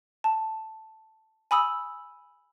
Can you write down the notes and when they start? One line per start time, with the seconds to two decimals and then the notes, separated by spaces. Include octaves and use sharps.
0.24 A5
1.51 G#5 B5 D#6 E6